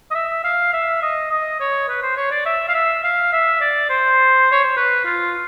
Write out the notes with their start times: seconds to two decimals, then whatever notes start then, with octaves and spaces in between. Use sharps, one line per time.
0.11 D#5
0.15 E5
0.44 F5
0.73 E5
1.02 D#5
1.31 D#5
1.60 C#5
1.89 B4
2.02 C5
2.17 C#5
2.31 D5
2.46 E5
2.68 F5
2.74 E5
3.04 F5
3.33 E5
3.61 D5
3.90 C5
4.52 C#5
4.64 C5
4.77 B4
5.05 F4